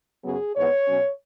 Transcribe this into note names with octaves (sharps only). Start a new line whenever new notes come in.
F#2 C#3 F#3 B3 G#4
G#2 E3 B3 C#5
B2 F#3 C#4